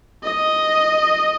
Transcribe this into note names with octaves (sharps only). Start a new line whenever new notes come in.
D#5